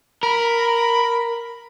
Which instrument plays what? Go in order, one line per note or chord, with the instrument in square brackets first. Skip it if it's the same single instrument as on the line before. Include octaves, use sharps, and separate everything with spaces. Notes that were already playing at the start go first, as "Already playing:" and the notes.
[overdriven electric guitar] A#4 [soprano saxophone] B5